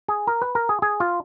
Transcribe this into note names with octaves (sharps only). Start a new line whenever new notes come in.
G#4
A#4
B4
A#4
G#4
G#4
F4